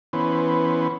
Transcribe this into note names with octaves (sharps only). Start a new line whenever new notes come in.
E3 B3 C#4 B4 C5